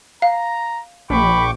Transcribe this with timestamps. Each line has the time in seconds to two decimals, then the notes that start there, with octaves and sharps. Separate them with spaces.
0.22 F5 A#5
1.10 A#1 G5 B5 C#6 D6